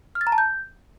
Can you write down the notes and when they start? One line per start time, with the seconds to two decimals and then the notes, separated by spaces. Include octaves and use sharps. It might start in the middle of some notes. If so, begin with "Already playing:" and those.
0.15 F6
0.21 A6
0.27 A#5
0.32 A5
0.38 G6